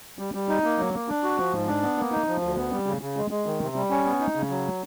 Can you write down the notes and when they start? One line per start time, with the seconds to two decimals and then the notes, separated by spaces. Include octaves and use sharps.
0.19 G3
0.34 G3
0.49 D#4
0.64 A#3
0.78 F#3
0.93 A#3
1.08 D4
1.23 F#4
1.38 F3
1.53 G#2
1.67 D4
1.82 B3
1.98 A#3
2.12 D#4
2.27 F3
2.42 D2
2.57 B3
2.72 G3
2.86 C#3
3.01 C#3
3.17 G#3
3.31 G#3
3.46 D#3
3.61 C3
3.76 G3
3.90 C#4
4.05 B3
4.20 D#4
4.35 C#3
4.50 F#3